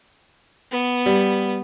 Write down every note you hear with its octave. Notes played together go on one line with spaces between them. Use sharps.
B3
G3